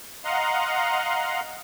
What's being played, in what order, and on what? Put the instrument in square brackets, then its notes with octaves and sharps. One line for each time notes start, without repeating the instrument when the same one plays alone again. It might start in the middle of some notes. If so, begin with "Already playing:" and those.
[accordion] D#5 F5 F#5 A#5 C6